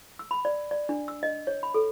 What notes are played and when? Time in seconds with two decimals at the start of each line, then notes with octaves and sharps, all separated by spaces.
0.19 E6
0.31 B5
0.45 D5
0.71 D5
0.89 D4
1.08 E6
1.23 D#5
1.47 C#5
1.63 B5
1.74 A4